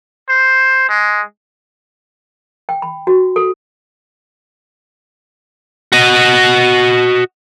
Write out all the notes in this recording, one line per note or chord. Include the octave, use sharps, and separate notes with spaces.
C5
G#3
G5
B5
F#4
A4
F#4 D#5